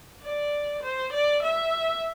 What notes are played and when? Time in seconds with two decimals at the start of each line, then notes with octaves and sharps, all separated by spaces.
0.21 D5
0.83 C5
1.13 D5
1.43 E5